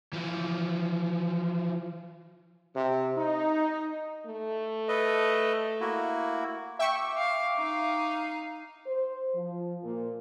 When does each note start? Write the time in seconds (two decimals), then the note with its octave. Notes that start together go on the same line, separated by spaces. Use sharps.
0.13 E3 F3
2.74 C3
3.17 D#4
4.26 A3
4.88 A4 B4 D#5
5.80 A#3 E4 F#4
6.79 E5 G5 C#6 D6
7.17 F5
7.56 D#4 F5
8.87 C5
9.35 F3
9.83 A#2